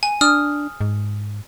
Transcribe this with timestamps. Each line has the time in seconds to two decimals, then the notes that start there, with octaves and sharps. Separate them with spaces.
0.03 G#5
0.21 D4 D#6 F6
0.81 G#2